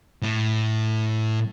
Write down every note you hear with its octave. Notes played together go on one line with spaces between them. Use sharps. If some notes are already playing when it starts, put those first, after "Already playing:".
A2